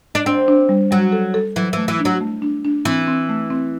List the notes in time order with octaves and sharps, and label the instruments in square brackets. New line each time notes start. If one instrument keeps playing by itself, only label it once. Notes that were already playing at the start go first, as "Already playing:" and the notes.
[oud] D4
[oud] C4 [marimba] D4
[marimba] D4
G3
[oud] F#3 [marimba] G3
[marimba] A4
A4
[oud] E3 [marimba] F#3
[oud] E3 [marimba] A3
[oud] E3
[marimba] D4
[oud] F#3
[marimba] A3
D4
D4
[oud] E3 [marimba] C4
[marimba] C4
A3
C4